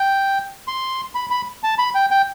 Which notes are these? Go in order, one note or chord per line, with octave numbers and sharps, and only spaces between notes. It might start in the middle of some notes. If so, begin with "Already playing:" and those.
Already playing: G5
C6
B5
B5
A5
B5
G5
G5